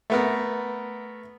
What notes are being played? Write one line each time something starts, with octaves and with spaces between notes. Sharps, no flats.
A3 B3 A#4